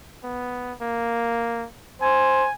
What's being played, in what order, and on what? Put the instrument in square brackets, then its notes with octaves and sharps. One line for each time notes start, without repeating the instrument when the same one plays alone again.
[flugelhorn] B3
A#3
[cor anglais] C5 [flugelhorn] G#5